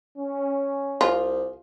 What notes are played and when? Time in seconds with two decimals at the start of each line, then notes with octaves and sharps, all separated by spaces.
0.17 C#4
1.01 C2 F4